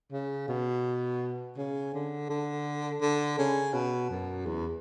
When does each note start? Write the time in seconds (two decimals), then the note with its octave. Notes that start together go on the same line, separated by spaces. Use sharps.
0.12 C#3
0.48 B2
1.57 C#3
1.94 D3
2.29 D3
3.01 D3
3.38 C#3
3.73 B2
4.10 F#2
4.46 E2